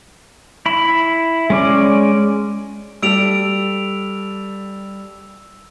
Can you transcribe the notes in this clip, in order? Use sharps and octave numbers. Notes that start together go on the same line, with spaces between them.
E4 B5
G#3 C#4 D5
G3 A4 E6 D7 F7